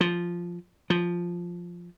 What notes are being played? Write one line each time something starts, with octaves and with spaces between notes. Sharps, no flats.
F3
F3